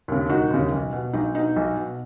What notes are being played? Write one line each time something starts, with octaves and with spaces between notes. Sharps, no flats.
D#2 C#3
E1 D#4 F#4
D#2 C#3
B1
B2
B1 D#4
B2 D#4
B1
B2